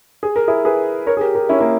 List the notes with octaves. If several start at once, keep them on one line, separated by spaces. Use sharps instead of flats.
G#4
A#4
E4 G#4
G#4 B4
A#4 C#5
G#4
G4 A#4
G4 A#4
C#4 E4
A#3 C#4